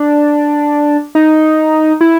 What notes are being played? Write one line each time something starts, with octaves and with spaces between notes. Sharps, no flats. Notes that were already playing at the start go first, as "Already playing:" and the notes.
Already playing: D4
D#4
E4